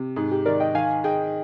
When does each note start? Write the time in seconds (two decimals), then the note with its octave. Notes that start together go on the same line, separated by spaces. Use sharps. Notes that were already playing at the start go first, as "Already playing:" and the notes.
Already playing: C3
0.16 G#2 G#4
0.32 G4
0.45 D#3 A#4 D5
0.60 D#5 G5
0.75 D#3 F5 G#5
1.04 G#4 D#5 G5